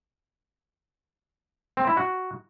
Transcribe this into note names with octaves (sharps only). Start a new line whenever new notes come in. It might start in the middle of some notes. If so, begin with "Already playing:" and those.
C4
E4
F#4